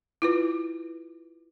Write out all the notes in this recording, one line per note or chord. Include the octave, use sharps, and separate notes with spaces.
E4 F4 B4